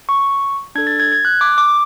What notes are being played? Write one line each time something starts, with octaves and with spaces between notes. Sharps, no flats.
C#6
D4 A4 G#6
A6
G#6
G#6
F#6
D6
D6